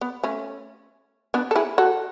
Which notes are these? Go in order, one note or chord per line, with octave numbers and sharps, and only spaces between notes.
B3
A3 C#4
B3 D4
A4
E4 G#4
F#4 A4